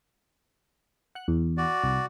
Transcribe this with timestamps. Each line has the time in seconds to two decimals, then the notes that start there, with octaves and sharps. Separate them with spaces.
1.15 F#5 F#6
1.28 E2
1.57 F#4 D5
1.84 C2